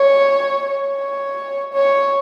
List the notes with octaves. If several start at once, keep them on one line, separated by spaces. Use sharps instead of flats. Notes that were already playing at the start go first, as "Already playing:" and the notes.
Already playing: C#5
C#5
C#5